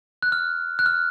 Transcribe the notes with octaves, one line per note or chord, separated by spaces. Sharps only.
F#6
F6
F#6
F6